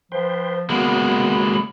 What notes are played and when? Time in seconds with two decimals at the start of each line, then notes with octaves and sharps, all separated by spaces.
0.12 F3 B4 C5 G5
0.70 C#3 G#3 A#3 B3 F#4 B5